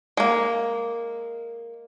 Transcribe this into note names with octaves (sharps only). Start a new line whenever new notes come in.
G#3 A#3